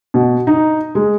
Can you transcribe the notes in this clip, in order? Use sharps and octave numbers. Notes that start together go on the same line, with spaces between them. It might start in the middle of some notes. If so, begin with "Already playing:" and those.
B2
D#4
G#3